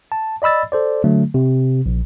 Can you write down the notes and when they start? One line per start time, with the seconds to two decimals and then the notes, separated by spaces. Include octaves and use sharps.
0.12 A5
0.42 D5 D#5 B5 E6 A6
0.72 A4 C5 D5
1.04 D3 F#3 A3
1.34 C3
1.86 A#1